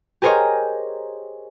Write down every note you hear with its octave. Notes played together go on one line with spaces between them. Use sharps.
G4 G#4 A#4 C5 C#5 D#5